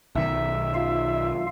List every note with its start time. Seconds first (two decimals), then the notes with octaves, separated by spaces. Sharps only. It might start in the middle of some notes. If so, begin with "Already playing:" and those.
0.15 B1 D#3 E5
0.74 F4 F5